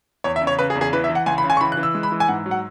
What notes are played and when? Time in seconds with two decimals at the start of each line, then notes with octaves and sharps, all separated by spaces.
0.24 E2 C#5
0.36 E5
0.41 C#3
0.47 C#5
0.59 C#3 B4
0.70 G#4
0.76 E2
0.81 G#4
0.93 E3 B4
1.04 E5
1.10 E3
1.15 F#5
1.26 C#2 G#5
1.38 B5
1.44 C#3
1.50 G#5
1.57 C#6
1.61 E3 B5
1.72 F#6
1.77 E3
1.83 E6
1.95 G#3
2.03 B5
2.12 E3
2.20 G#5
2.28 G#2 F#5
2.46 F#3
2.51 F#5